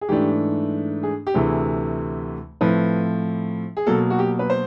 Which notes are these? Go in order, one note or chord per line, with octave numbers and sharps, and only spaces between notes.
G#4
G#2 E3 A3 D4 G4
G#4
G4
D2 C3 E3 A3 G#4
A2 F3 A3 C4 E4 B4
G#4
B2 F#3 A#3 A4
F#4
G4
B4
C5